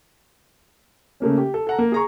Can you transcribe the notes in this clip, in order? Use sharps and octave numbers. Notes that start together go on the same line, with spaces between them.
C#3 A3 A#3 C#4
G4
A4
A4 F#5 A#5
A#3
G#4 A#5 C#6